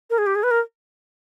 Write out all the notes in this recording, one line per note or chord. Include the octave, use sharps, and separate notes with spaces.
A#4
G#4
G4
G#4
B4
A#4